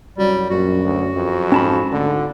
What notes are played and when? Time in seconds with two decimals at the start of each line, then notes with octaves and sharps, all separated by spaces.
0.18 C2 F#2 F#3 G3
0.50 A#1 F#2 F#4
0.83 D2
1.14 F2
1.52 G#2 C#4 A5 B5
1.92 G#1 D2 D3